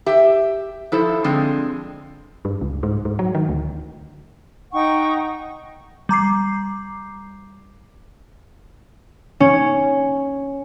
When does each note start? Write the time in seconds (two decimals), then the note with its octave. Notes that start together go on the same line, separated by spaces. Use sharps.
0.06 G4 E5
0.92 F3 E4 A4 C5
1.24 D3 F3 G#3 C4
2.45 G2
2.61 C#2
2.83 G#2
3.05 G#2
3.19 F#3
3.35 D#3
3.49 D2
4.73 D#4 F#5 G5 C#6
6.09 G3 A#5 D6 C7
9.40 C#4